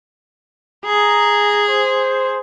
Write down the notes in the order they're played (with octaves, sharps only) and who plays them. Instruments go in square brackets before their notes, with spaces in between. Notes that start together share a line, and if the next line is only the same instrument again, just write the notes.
[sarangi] G#4 [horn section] A#5
[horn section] C5